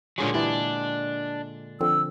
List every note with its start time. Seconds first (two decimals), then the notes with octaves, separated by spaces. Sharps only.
0.18 A#2 D3 F#3 G#3 G#4 C#5
0.34 E3 D4 E4 G4
1.81 D3 F3 C4 E6